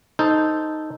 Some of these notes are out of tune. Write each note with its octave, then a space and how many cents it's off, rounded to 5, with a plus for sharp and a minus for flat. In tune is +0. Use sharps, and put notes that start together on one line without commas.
D#4 +0 A4 +0 C5 +0